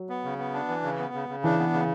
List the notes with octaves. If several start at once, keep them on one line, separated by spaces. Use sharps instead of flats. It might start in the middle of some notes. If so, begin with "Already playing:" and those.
Already playing: F#3
B3
C#3
B3
D4
E3
C#3
B3
C#3
C#3
E3 D4
B3
C#3